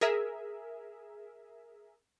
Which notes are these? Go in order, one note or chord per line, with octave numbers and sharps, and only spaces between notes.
G#4 A#4 E5